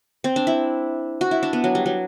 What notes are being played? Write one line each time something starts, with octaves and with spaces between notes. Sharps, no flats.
C4
D4
E4
F#4
E4
D4
B3
F#3
G3
F#3